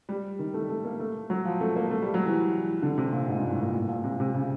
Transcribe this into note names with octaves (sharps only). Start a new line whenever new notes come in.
G3
D#3
A3
A3
A#3
A3
F#3
F3
A3
A#3
A3
G3
F#3
E3
D3
C3
A#2
G#2
G2
A2
A#2
A2
A#2
C3
C3
C#3